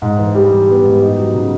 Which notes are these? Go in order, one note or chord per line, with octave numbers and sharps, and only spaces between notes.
G#2
E3
G3
G#2
B3
G#2
D#4
F#3
C#3